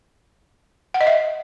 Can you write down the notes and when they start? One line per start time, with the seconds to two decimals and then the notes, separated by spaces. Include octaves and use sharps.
0.94 F#5
1.01 D#5
1.07 E5